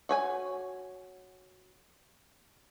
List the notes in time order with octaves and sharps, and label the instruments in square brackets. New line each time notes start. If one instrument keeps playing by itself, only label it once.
[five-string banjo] F#4 C#5 G#5